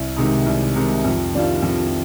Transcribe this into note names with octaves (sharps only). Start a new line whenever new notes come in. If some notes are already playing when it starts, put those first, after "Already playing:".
Already playing: C2
C3 D#3 G#3 D#4
C2
C3 D#3 G#3 D#4
F2
D#3 G3 D4 F4
F2